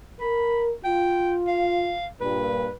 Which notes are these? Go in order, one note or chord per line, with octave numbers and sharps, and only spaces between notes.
A#4 B5
F4 G5
F5
G2 A#2 B4